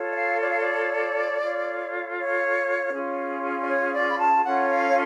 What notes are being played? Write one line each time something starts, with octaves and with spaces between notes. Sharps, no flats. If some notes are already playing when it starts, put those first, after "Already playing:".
Already playing: F4 A4 C#5
D5
F5
D5
F5
D5
F4 A4 C#5
C#5
C#4 F4 G#4 C#5
D5
C#5
D5
B5
A5
C#4 F4 A4 C#5 F#5
F5
C#5